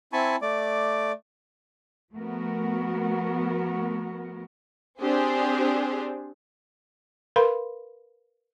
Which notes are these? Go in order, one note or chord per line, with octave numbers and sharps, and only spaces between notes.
C4 E4 G#5 A5 B5 C#6
A3 D5 D6
F3 A3 B3 F#4 A#4
C4 D4 G4 G#4 C5
A#4 B4 F5 B5 C6